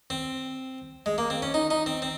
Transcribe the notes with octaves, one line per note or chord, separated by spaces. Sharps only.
C4
G#3
A#3
C4
C#4
D#4
D#4
C4
C4